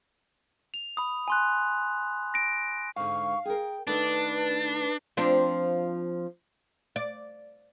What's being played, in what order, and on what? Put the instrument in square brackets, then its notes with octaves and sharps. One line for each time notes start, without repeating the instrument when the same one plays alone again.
[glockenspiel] F7
B5 D#6
G#5 C6 F#6
A#6 D7
[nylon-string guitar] G#2 D3 [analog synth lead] F5 [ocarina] C#6
[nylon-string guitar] G#4 A#4 [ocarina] G5
[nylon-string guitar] D#3 A3 A4 [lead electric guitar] D4 [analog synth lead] B4 [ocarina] A5
[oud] F3 C4 D4
D5